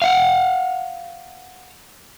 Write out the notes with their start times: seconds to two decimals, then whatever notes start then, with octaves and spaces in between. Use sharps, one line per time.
0.02 F5 F#5